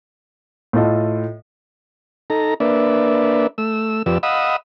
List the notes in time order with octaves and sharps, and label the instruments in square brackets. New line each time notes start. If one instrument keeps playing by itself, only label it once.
[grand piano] A2 F4 A4 D#5
[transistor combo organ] D#4 A4 A#5
A#3 D4 B4 D5 E5
A3 E6
F2 F3 G4 B4 D5 E6
D#5 F5 F#5 B5 D#6 E6